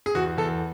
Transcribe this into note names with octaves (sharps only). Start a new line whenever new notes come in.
G#4
E2 F#4
E2 A4